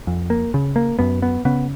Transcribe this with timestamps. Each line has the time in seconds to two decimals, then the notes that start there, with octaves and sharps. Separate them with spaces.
0.07 F2
0.30 A#3
0.54 C#3
0.76 A#3
0.99 F#2 B3
1.22 B3
1.45 C#3 B3